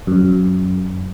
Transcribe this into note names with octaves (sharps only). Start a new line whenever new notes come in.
F#2